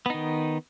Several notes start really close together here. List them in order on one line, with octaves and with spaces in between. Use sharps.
B3 D#4 D#3